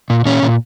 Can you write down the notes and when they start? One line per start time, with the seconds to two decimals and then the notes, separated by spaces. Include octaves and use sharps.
0.10 A#2
0.25 A#2 C#4
0.43 A#2